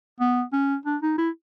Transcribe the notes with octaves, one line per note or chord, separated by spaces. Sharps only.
B3
C#4
D4
D#4
E4